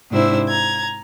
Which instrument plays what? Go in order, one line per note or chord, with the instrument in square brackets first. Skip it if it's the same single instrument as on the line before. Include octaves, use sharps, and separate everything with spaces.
[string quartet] G#2 C3 D4 E4 C5 E6
A#5 G#6